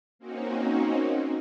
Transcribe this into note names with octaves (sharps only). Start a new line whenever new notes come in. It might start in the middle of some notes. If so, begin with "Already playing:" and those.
A#3 C4 C#4 D#4 F#4